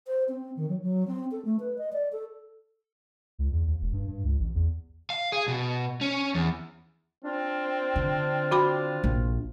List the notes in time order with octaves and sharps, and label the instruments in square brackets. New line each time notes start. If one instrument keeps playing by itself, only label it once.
[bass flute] C5
C4
D#3
F#3
F#3
C4
A4
A3
B4
D#5
D5
A4
[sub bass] C#2
E2
D#2
E1
G2
G2
C#2
A1
E2
[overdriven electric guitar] F5
G#4
B2
C#4
E2
[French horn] C4 [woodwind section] D4 F4
[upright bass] D3
[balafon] F#4 B5 D6
[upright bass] A#1